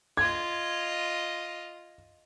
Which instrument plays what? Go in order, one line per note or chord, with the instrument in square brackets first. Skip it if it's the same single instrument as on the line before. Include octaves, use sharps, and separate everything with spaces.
[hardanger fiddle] F4 D#5 [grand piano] G#6